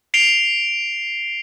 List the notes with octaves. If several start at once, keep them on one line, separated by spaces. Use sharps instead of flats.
C7 D7 F7 G7